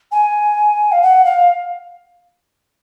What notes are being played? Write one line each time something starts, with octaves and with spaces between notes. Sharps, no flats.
G#5
F5
F#5
F5